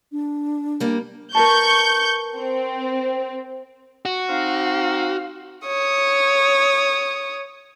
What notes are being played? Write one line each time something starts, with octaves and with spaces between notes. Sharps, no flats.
D4
G3 A#3
A#4 B4 A5 C#6 G6
C4
F#4
C4 D#4 F5
C#5 D#6